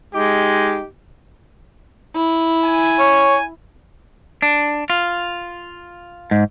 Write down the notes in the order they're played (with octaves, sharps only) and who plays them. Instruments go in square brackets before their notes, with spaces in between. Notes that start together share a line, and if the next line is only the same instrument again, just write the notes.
[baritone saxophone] G#3 [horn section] D#4 G4
[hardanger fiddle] E4
[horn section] G#5
[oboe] C#5
[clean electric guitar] D4
F4
G#2